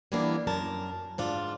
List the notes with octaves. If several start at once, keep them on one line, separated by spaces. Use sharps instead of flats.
E3 G3 A#3 B3 D4 E4
F#2 A#4 A5
G#2 D4 F4